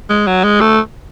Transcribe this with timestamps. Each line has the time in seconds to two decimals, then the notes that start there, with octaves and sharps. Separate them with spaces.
0.10 G#3
0.27 F#3
0.44 G#3
0.61 A3